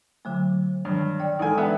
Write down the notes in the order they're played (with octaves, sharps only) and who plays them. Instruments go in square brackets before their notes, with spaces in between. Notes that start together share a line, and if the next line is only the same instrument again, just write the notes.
[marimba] D3 F#3 A3
[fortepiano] G2 [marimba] D#3
[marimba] D5 G5
[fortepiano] D#3 G#5 [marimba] E3 G#3 A4
[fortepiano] B3 D4 E5 [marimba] G5